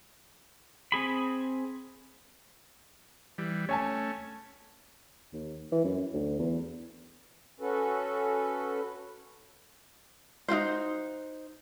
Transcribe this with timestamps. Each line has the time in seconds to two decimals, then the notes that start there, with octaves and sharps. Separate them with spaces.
0.92 C4 G#4 B5
3.38 E3 G3
3.69 A3 C#4 C#5 G#5 A5
5.33 D#2
5.72 E3
5.85 F#2
6.14 D2
6.39 E2
7.60 C#4 F#4 A4 B4
10.48 D#4 F4 F#4 C5